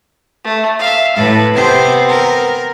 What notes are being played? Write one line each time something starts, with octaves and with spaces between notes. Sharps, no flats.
A3
E5 F5
A2 A4 B4
C3 B3 C4 C5
A#4